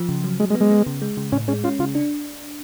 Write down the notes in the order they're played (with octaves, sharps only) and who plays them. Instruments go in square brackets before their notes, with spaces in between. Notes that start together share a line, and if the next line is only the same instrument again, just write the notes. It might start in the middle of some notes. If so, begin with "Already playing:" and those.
Already playing: [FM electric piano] F3
C#3
F#3
[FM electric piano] F#3 [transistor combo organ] G#3
[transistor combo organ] G#3
[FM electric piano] B3
[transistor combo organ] G#3
[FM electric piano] B3
C#3
G#3
C#3
[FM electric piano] A2 [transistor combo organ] C#4
[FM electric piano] G#3 [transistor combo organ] C#4
[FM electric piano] C#4 [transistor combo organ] F4
[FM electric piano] C#3 [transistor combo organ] F4
[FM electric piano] D4